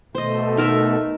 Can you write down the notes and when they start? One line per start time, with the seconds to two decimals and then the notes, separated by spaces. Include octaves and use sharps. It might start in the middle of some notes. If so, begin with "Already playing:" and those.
0.15 B2 A3 C5 D#5
0.57 D#4 A#4 E5